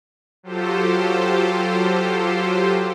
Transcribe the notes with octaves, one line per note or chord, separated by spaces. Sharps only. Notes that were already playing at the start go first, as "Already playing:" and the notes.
F#3 F4 G4 A4 C5